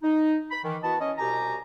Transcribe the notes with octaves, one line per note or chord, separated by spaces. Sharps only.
D#4
B5
D#3 E3
B3 E4 F#4 D#5 A5
C#4 D#5
C2 B2 G4 G#5 A#5